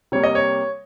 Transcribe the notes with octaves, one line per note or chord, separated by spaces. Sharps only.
C3 G3 A#3 C#5
D#5
C#5